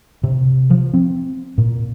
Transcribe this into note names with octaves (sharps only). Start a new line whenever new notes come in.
C3
F3
C4
A#2